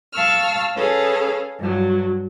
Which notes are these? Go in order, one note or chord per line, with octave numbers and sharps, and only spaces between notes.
F5 A5 C#6 E6 F6
C#4 G#4 A4 B4 F5
G2 F#3